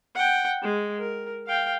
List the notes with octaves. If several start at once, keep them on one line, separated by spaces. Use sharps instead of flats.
F#5 G5
G#3
A#4
F5 G5